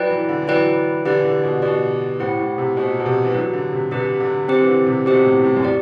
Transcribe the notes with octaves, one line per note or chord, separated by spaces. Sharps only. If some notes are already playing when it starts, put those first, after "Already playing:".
Already playing: F#3 E4 B4 D5 G5
E3
D3
E3
F#3 E4 B4 D5 G5
D3 G4 B4 D5
E3
D3
B2
B2 G4 B4 D5
A2 E4 G4 C5 F#5
A2
C3
B2 E4 G4 C5 F#5
B2
C3
E3
F#3 D4 G4 B4
D3
C3
C3 D4 G4 B4
D3
C4 G4 C5
E3
D3
C3
B2 C4 G4 C5
A2
A2
F#2
G4 D5